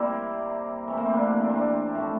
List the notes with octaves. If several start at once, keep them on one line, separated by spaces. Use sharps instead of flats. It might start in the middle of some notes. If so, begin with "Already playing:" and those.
Already playing: C3 G3 A#3 C4 E4 G4 D5
C3 E3 A3 C4
A#3
C4
A#3 D4
D4
C4
A#3 D4
A2 F3 A3